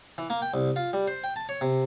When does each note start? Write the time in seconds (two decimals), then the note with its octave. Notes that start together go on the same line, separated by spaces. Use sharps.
0.18 E3
0.30 A#3
0.42 G5
0.54 C2
0.76 F4
0.93 G3
1.08 C5
1.24 G5
1.36 A5
1.49 C#5
1.61 C3